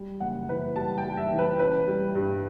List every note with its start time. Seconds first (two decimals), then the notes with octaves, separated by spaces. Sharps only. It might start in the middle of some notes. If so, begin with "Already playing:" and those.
Already playing: G3
0.20 F#1 F#5
0.49 E3 B4
0.76 G3 A5
0.98 G5
1.04 G3
1.17 E5
1.32 E3
1.39 B4
1.59 C#4 B4
1.87 G3
2.15 G2